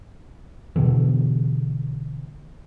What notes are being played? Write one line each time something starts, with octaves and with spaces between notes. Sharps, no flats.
B2 D3 E3